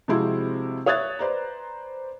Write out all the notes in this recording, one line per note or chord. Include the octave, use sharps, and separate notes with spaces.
C3 F3 G#3 C4 E4 F#4
C#5 E5 D#6 F#6 G#6 A6
B4 C5 D5 A#5